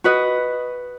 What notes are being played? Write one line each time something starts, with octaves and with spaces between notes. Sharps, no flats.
F#4 B4 D#5